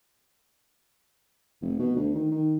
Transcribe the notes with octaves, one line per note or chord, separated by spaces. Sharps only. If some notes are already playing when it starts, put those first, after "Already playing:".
F1
B2
D2
D#3
D#3